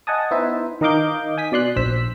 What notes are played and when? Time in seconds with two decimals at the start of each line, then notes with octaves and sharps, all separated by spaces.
0.07 D#5 F#5 G#5 A5 D#6
0.31 B3 D#4 E4 C5 E5
0.81 D#3 A#4 D#5 F5 D6 G6
1.38 G#5 D#6 B6
1.52 B2 D5 C6 F#6
1.76 A#1 C5 E6 B6